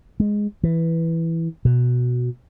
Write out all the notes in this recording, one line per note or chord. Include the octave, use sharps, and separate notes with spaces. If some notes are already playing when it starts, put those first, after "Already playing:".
G#3
E3
B2